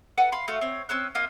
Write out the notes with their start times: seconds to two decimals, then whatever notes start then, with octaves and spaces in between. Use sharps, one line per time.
0.18 A4 B4 F#5
0.32 F5 B5 C6
0.48 A3 F#4 F5
0.61 C4 C#5
0.89 C4 C#4 E6 F#6
1.15 A#3 D#4 F4 D#5